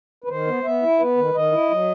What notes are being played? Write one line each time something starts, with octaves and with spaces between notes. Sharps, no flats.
B4
D#3 C5
B3
B3 E5
E4
B3 B4
D#3
D#3 D#5
E4
F#3